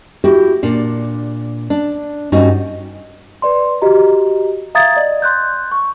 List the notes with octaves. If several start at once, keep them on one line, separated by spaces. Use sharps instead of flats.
E4 F#4 G4
A#2 D4
D4
G2 C#4 D#4 F#4
B4 D5 C6
F#4 G4 D#5 A#5
E5 F5 A#5 D#6 G#6 A6
D5 D#5
C6 F#6 G6
C#6